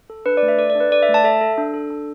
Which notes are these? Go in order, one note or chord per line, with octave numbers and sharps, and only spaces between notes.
A4
D4 B4
D5
A3
E5
A4 D5
D5
D4
B4
A4 D5
E5
A3
A5
A4 E5
A4
D4
A4
D4